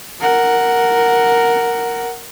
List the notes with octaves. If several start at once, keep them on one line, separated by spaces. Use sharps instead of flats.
A#4 F#5